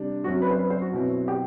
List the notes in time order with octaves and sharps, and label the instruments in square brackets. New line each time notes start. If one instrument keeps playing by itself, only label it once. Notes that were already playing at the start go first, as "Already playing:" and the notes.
Already playing: [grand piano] C3 G3 D4
[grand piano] F#2 F#3 C4 [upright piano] F#4
[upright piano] B4
C5
B4
C5
F#4
[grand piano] B2 F#3 C4 E4
[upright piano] G4